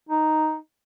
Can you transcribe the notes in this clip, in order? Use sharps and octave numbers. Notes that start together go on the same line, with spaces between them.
D#4